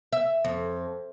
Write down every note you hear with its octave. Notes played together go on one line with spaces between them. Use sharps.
E5
F2